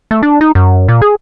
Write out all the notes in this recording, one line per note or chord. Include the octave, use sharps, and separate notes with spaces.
A3
D4
D#4
F#2
A#2
G#4